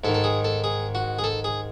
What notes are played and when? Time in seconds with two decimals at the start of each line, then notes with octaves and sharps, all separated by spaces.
0.04 G#2 A4
0.08 D#3
0.14 A4
0.24 G#4
0.45 A4
0.64 G#4
0.95 F#4
1.19 G#4
1.24 A4
1.44 G#4